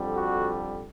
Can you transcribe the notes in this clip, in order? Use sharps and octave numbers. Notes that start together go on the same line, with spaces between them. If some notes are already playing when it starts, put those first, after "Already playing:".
Already playing: F2 D3 G3
F#4